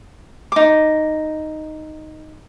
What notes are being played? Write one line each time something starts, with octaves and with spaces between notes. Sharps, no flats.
D#4 D6